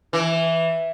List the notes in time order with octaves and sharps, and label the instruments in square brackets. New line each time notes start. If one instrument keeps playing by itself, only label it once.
[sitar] E3